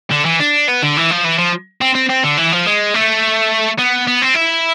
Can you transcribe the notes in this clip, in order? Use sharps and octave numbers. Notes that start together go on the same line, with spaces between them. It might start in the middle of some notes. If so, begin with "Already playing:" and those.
D3
E3
D4
B3
D3
E3
F3
E3
F3
C4
C4
C4
D3
E3
F3
G#3
A3
B3
B3
C4
E4